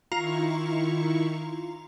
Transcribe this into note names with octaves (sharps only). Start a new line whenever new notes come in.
D#3 E4 F4 A#5 C#6